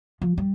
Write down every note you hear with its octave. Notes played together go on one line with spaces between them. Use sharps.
F3
G3